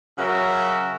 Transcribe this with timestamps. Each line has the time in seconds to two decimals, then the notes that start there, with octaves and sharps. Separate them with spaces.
0.18 C#3 F#3 C#4 F#4 A#4 E5